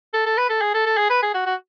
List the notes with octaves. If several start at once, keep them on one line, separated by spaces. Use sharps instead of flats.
A4
A4
B4
A4
G#4
A4
A4
G#4
B4
G#4
F#4
F#4